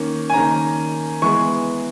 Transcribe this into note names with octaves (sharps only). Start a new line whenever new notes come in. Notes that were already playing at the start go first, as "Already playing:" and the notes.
Already playing: D#3 A#3 C#4
G#5
D#3 A#3 C#4 A#5
E3 G#3 B3 C#6